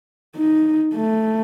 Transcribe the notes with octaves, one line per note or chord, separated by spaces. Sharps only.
D#4
A3